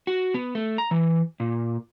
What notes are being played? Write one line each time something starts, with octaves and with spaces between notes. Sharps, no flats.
F#4
B3
A3
A#5
E3
A#2